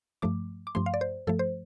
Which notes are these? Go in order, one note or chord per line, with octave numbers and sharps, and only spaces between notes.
G2 F3 A3 D6
D6
G2 F3 A3 C6
F5
D5
C5
G2 F3 A3 A4
C5